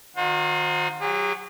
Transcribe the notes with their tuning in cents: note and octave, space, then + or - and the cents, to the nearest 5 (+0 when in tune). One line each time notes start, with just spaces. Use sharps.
D#3 -15 F#4 -45 C5 +15
F#3 +10 G#4 -45